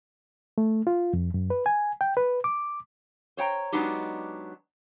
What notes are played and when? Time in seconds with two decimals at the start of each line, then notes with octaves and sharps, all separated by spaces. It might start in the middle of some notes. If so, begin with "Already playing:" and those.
0.58 A3
0.87 F4
1.13 F2
1.34 F#2
1.50 B4
1.66 G#5
2.01 G5
2.17 B4
2.44 D6
3.37 C5 C#5 G5 A#5
3.72 F#3 G#3 B3 D4 D#4 G4